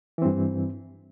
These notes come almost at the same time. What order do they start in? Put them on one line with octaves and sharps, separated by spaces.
E3 C4 G2